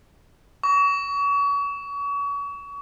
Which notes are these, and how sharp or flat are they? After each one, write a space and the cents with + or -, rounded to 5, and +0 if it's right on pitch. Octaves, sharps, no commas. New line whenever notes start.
C#6 +35